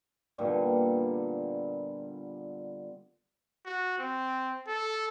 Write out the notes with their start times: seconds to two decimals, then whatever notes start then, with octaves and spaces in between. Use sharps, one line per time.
0.38 A#2 D3 G3 B3
3.65 F#4
3.99 C4
4.67 A4